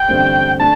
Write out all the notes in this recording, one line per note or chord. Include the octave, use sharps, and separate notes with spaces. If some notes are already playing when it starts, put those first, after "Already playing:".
Already playing: G5
A1 G2 D3 A3 C4
A3 D4 A5